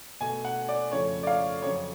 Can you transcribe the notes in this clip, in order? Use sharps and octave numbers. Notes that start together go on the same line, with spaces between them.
B2 A3 G#5
F#5
D5
F2 C#3 F3 A3 C#5
D5
F5
F2 C#3 F#3 C#5